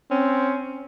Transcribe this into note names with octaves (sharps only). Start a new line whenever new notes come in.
C4 C#4